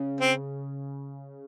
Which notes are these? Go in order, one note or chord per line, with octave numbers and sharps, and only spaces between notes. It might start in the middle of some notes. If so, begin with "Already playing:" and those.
Already playing: C#3
C4